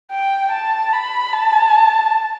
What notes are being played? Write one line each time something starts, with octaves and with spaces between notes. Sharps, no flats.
G5
A5
B5
A5